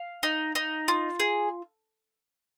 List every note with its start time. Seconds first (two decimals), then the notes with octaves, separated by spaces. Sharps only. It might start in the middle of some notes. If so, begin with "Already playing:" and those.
Already playing: F5
0.23 D#4
0.55 D#4
0.88 F4
1.20 G#4